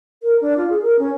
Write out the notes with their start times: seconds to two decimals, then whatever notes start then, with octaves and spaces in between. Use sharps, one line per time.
0.23 A#4
0.41 D4
0.57 F4
0.70 G#4
0.82 A#4
0.99 C#4